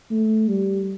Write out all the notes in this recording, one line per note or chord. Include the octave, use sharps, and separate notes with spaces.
A3
G3